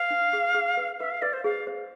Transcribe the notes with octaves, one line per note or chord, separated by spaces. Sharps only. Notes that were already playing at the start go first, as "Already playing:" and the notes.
Already playing: B4 F5
D4
G#4
G#4
B4
B4 E5
F5
B4 D5
C5
G#4 F5
C5